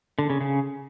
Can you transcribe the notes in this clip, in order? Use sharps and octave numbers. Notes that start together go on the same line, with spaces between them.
D3
C#3
C#3